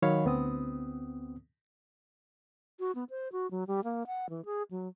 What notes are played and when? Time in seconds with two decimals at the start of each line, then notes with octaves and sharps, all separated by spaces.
0.02 D#3 F#3 C#5 F5 B5
0.25 D2 B3 C4 D#6
2.80 F#4
2.95 B3
3.10 C5
3.32 F#4
3.51 F#3
3.68 G3
3.84 A#3
4.07 F#5
4.30 E3
4.45 G#4
4.71 F#3